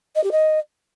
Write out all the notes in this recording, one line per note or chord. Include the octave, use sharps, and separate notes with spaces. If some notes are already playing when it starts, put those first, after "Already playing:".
D#5
G4
D#5